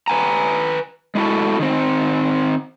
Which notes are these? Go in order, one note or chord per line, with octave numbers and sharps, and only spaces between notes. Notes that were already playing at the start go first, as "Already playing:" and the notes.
B4 G#5 A#5
G#3 A3 E4 F#4 A4
D#3 C4